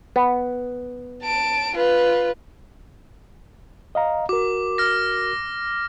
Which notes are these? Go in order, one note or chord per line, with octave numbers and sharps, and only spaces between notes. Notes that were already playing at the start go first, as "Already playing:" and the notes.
B3
A5 D7
F4 B4
D#5 F5 A#5
F#4 A#4 D6
F6 A#6